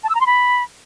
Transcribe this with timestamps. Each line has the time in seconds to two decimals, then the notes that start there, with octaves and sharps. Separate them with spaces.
0.04 A5
0.09 E6
0.15 A#5
0.21 C6
0.26 B5